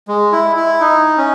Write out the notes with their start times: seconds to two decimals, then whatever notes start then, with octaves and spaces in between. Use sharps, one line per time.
0.08 G#3
0.32 E4
0.56 E4
0.80 D#4
1.18 C#4